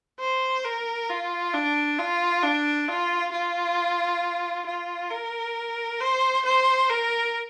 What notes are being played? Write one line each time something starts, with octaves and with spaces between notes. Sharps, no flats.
C5
A#4
F4
D4
F4
D4
F4
F4
F4
A#4
C5
C5
A#4